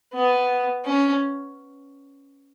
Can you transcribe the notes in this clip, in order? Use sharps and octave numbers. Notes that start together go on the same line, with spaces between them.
B3
C#4